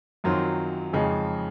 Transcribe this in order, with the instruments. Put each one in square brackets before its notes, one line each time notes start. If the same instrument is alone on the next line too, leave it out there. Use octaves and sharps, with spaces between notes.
[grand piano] F#2 D#3 F#3 C4 F4
F2 C#3 F3 G#3 D#4